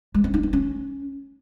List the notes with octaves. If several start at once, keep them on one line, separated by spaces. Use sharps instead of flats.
G#3
C4
D#4
B3
C#4